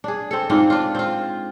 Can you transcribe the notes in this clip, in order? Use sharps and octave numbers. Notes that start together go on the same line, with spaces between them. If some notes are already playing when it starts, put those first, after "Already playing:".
D4 G#4
C4 A4
G#2 C4 D4 F4
D4 F4
C4 F4